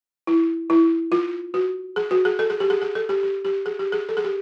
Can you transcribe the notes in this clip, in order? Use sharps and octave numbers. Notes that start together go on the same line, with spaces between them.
E4
E4
F4
F#4
G#4
F#4
G#4
A4
G#4
G4
G#4
G#4
A4
G4
G4
G4
G#4
G4
G#4
A4
G#4
G4